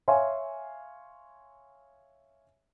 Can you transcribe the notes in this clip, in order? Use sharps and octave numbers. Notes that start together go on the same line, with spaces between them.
C#5 E5 F5 G#5 C6